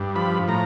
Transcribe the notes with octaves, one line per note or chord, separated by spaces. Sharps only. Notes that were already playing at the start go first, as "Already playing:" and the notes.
Already playing: G2
F3 B5
A2 A#5